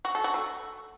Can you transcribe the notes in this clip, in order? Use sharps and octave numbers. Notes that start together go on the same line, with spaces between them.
F#4
A4
F#4
A3